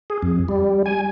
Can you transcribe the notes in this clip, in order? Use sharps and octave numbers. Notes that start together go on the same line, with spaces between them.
G#4
F2
G3
G#5